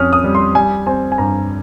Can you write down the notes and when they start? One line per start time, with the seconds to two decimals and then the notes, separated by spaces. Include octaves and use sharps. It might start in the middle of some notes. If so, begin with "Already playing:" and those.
Already playing: F2 C#4 D#6 F6
0.13 D#6
0.24 G3
0.35 C6
0.55 G3 G#5
0.87 C4 G#5
1.12 G#5
1.18 G2 A#5